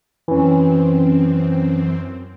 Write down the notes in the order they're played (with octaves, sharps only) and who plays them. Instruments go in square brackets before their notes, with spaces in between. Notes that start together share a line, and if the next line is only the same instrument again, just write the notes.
[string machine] F#2 C4 [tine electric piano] E3 C#4